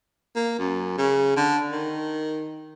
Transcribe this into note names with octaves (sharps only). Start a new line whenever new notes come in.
A#3
F#2
C#3
D3
D#3